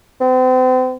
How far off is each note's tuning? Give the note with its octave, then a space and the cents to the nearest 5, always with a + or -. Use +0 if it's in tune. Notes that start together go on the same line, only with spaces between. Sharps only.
C4 -40